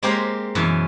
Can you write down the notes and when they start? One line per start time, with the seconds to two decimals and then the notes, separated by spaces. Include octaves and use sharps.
0.03 G#3 A#3 C4 G4 C5 F5
0.55 F#2 B2 E3 A5